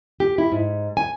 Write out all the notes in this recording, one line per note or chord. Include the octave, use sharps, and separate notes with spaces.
G4
E4
G#2
G#5